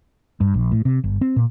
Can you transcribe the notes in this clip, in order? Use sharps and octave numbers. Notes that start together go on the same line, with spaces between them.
G2
A#1
A2
C3
G1
C4
A#2